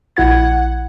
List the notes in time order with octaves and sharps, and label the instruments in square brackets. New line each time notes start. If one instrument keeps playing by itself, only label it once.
[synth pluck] A#1 E4 G#6 [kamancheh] F#5